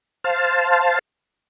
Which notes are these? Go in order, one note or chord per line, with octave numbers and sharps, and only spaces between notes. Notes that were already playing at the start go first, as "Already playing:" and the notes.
C5 F5 A5